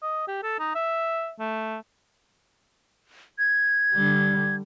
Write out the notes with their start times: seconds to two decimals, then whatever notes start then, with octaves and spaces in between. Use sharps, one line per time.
0.02 D#5
0.27 G4
0.43 A4
0.59 D#4
0.75 E5
1.39 A3
3.39 G#6
3.94 D3 G3